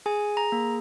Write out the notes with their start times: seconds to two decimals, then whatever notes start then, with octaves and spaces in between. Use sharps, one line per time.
0.06 G#4 G#5
0.37 A#5
0.52 A#3